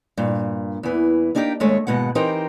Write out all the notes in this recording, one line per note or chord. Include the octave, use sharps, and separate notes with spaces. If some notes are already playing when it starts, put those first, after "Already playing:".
G2 A#2
E2 E3
A#3 D4 D#4 G4 C#5 G5
D#2 G#3 A3 C#5
D#2 G#2 B2 G#3 F#5
E3 C4 D#4 G4 A#4 C5